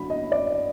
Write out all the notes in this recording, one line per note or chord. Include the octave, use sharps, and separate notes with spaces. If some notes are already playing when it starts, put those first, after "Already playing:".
Already playing: D3 F#3 B5
D#5
D5